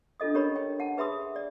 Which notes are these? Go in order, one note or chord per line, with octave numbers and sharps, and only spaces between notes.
D4 F4 A4 D#5 D#6
C#4 G4 A#4 C#5 A#5 B5
G5
F#5 A5
G#4 B4 E5 B5 C6 D#6
D5